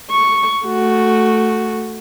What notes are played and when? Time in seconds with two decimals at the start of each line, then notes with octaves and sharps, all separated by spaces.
0.11 C#6
0.66 A3 F#4